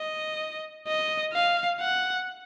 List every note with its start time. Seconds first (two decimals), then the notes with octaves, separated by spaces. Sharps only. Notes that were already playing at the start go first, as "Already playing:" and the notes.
Already playing: D#5
0.87 D#5
1.33 F5
1.80 F#5